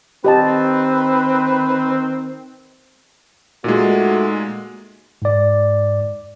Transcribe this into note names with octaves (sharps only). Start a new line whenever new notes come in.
D#3 C4 G4 B4 D#5 A5
A#2 G#3 A3 D#4 F#4
G#2 D5